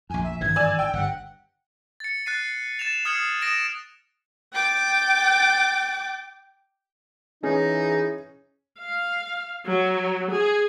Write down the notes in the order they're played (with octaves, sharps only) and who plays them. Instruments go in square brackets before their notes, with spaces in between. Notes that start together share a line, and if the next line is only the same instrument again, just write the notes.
[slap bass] A#1 F2 [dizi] G#5
[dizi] E5
[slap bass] G#1 G2 E3 [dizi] G#6
[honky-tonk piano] D5 G#5 E6
[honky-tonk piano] G5 [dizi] E6
[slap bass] G1 G2 [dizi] F#5
[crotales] A6 C#7
F#6 A6 C7 D#7
A6 E7 F7
D#6 F6 G#6 C7 C#7 F#7
D#6 A#6 D7 E7
[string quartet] G5 D6 A6
[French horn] E3 [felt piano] C#4 [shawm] D#4 [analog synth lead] G#4
[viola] F5
F#3
G#4